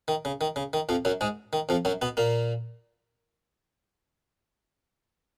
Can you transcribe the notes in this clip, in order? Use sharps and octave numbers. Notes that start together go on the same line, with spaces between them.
D#3
C#3
D#3
C#3
D#3
F2 F3
F#2 F#3
G#2 G#3
D#3
F2 F3
F#2 F#3
B2 B3
A#2 A#3